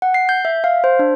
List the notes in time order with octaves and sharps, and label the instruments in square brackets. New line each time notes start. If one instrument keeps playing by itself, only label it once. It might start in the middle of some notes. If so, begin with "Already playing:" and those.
[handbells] F#5
C7
G6
E5
F5
C5
D4